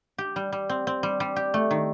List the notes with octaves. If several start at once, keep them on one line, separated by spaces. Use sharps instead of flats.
G4
G3
G3
C4
C4
G3
G3
G4
A3
D#3